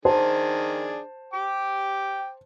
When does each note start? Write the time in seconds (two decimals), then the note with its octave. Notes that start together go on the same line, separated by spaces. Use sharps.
0.05 D#3 D4 G#4 C5 A5
1.33 G5 D6